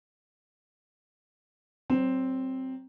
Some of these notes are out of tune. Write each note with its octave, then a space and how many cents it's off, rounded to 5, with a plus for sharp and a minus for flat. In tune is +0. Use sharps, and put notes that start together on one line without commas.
F#3 +25 C4 +0